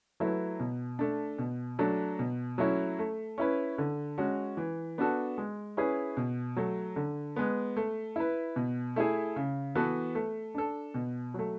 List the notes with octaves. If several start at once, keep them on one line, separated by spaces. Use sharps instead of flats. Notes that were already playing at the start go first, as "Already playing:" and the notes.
F#3 A3 E4 B4
B2
A3 D4
B2
F#3 A3 D4
B2
F#3 A3 C#4 E4
A3
C#4 E4 B4
D3
G#3 C#4 F#4
E3
B3 D4 F#4 A4
G#3
C#4 E4 G#4 B4
B2
F#3 A3
D3
G#3 B3
A3
E4 B4
B2
A3 E4 G#4
C#3
E3 B3 F#4 A4
A3
D4 A4
B2
F#3 A3